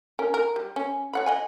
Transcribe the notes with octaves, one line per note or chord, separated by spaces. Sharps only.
C#4 A#4
A#4
G3
C#4
C#5 F#5 B5
D#5 F#5 G#5